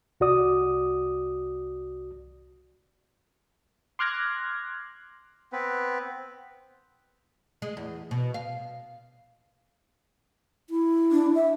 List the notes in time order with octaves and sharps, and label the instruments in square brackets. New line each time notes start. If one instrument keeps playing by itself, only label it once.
[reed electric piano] C2 F#4 D5 D#6
[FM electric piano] C6 D6 F6 F#6 G#6 A#6
[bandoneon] B3 C4 B4
[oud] G#3
E2
B2
F5
[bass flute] E4
[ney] D4
E5